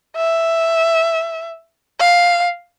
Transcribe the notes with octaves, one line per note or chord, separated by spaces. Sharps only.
E5
F5